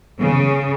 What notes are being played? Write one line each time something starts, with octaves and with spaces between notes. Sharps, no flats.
C#3